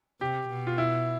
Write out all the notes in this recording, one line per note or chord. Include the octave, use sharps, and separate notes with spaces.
C3 G4
B2
F4
E4